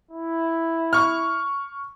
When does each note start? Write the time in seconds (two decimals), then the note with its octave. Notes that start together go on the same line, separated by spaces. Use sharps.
0.11 E4
0.93 C#6 F6